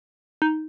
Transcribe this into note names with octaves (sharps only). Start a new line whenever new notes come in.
D#4